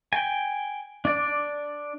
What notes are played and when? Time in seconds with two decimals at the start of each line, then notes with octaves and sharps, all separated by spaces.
0.13 G5 G#5
1.05 D4 D5